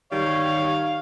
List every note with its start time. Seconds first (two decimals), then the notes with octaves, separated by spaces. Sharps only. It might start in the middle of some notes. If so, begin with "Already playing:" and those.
0.12 D#3 G3 C#5 F5